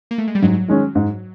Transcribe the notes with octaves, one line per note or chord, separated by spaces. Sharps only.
A#3
A3
G#3
G3
G#2 F#3
D#3 G#3 C#4
G#2